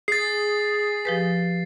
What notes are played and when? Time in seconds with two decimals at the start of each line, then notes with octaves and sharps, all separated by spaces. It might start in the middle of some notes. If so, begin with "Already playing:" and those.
0.08 G#4 A6 C7
1.05 F3 G4 B4